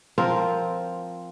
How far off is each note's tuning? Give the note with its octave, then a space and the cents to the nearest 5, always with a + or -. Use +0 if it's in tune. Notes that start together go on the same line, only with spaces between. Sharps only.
F3 +0 C4 +0 A#4 +0